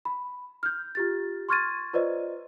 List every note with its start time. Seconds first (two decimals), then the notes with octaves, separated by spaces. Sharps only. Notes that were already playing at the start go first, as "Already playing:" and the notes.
0.05 B5
0.63 F6 G6
0.95 F4 G4 A6
1.49 C6 C#6 F6 G#6 A6 D#7
1.93 F4 B4 C5 D5 D#5